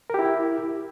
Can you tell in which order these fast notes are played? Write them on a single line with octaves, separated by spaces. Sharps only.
A#4 G4 E4